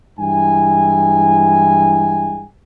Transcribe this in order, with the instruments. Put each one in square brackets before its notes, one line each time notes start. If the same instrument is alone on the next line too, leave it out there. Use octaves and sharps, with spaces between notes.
[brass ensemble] G2 E3 G#3 E4 G5 G#5